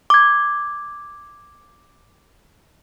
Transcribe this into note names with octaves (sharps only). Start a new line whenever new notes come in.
D6 G#6